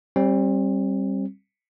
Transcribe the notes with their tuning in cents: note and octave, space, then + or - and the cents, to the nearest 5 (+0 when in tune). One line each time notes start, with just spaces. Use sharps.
G3 +0 C4 +35